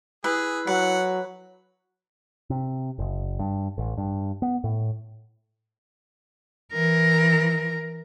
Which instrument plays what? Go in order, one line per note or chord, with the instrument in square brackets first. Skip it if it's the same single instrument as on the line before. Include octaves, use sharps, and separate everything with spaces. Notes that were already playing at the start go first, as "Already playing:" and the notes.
[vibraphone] E4 [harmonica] G#4 [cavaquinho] B4
[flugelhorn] F#3 [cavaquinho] B4 [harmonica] F#5
[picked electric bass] C3
F#1
G2
A1
G2
B3
A2
[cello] E3 A#4